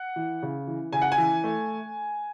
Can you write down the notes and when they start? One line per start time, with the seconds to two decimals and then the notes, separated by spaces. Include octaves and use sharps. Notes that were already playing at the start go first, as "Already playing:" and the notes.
Already playing: F#5
0.16 E3
0.43 C#3
0.67 E3
0.93 C#3 G#5
1.02 F#5
1.12 G#5
1.18 E3
1.44 A3